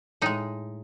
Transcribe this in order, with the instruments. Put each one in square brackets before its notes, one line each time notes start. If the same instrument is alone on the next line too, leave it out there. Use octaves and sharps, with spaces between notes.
[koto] A2 G#3 D#4